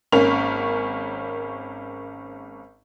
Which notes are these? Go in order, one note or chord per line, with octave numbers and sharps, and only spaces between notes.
G#1 A#3 C#4 A#4 C#6 F7